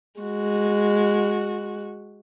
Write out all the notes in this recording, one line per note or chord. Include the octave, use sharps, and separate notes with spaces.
G#3 F#4